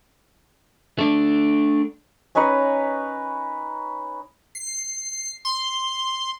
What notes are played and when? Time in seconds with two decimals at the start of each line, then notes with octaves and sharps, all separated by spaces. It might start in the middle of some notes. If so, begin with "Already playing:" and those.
0.99 A3 D4
2.35 C#4 D#4 B4 C#5
4.55 C7
5.45 C6